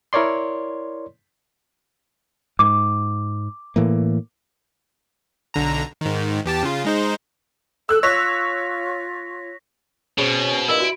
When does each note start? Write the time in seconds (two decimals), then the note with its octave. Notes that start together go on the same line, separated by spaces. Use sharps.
0.13 E4 A#4 C#5 D5 C6
2.59 G#2 D6
3.76 A2 E3 A#3
5.54 B1 D3 A#5
6.01 G#2 D#3
6.45 E2 G4 A5
6.63 C#3 F4
6.85 G#3 D#4 C5
7.89 A4 E6 F#6
8.03 F4 C#5 E6 A#6 B6
10.18 B2 C4 C#4 G#4
10.69 G2 A#2 E4 D#5 E6
10.80 F#4 D7